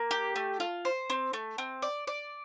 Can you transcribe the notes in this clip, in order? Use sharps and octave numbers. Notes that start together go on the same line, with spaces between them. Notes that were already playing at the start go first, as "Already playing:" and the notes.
Already playing: A#3
G4
A3
F4
C5
C4
A3
C4
D5
D5